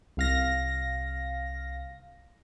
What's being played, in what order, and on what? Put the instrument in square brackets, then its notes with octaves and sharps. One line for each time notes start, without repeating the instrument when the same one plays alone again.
[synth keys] C2 F5 A#6